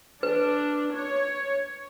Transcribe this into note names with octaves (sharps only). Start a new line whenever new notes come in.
D4 B4
C#5